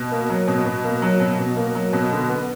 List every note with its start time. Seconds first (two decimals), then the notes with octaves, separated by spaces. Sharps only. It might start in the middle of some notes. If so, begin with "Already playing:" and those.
Already playing: B2
0.12 A#3
0.30 F#3
0.48 B2
0.66 B2
0.84 A#3
1.02 F#3
1.20 B2
1.39 B2
1.56 A#3
1.75 F#3
1.93 B2
2.12 D3
2.29 B3